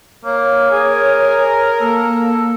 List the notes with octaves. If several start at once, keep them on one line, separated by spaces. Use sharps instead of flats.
A#3 C#5
G#4 A#4
A#3 A4